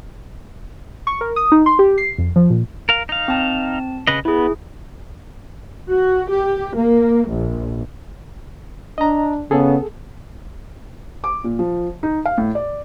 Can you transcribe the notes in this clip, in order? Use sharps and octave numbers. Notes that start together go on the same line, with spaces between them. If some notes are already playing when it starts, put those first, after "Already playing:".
C#6
A#4
D#6
D#4
C6
G4
C7
F2
F3
A#2
A#4 F5
D#4 F5
C4 A5
C#3 B4 D#5
B3 E4 G#4
F#4
G4
A#3
A#1
D4 D#5 A#5
C#3 B3 G#4 A4
D6
A#2
F3
D#4
F5
A2
D5